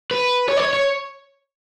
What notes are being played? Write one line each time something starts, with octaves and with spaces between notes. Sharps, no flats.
B4
C#5
D5
C#5
C#5